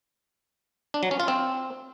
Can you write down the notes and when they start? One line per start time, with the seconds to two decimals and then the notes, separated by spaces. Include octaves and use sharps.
0.94 D4
1.03 F#3
1.11 C#4
1.20 F4
1.28 C4